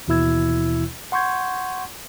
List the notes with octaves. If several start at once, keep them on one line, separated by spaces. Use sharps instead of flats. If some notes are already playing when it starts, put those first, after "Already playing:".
D#2 B2 E3 E4 E6 G#6
F#5 C6 C#6 G6 G#6